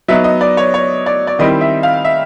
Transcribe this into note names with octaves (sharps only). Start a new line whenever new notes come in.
F#3 B3 D#4 E5
D#5
D5
C#5
C#5
D5
D5
D#3 G3 C4 E4 D#5
E5
F5
E5